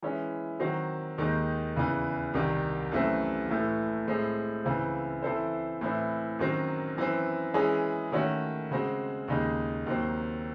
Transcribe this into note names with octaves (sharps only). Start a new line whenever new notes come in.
E3 G#3 C#4 E4
D#3 F#3 C4 F#4
D#2 D#3 G#3 D#4
E2 C#3 E3
C2 C3 D#3
F#2 E3 A3 C4
A2 E3 A3
A2 G#3 C4 E4
C#2 C#3 E3 C4
E3 C4 E4 A4 C5
A2 E3 C4 E4
F#2 D#3 F#3 C4
F#2 E3 C4
E3 G#3 C#4 G#4
D#3 A3 C#4 F#4 C#5
C#3 G#3 C4 F#4
D#2 C#3 G#3 D#4
D#2 D#3 F#3 C4